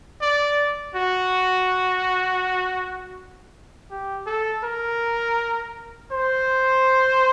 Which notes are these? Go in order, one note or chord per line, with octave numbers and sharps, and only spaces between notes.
D5
F#4
G4
A4
A#4
C5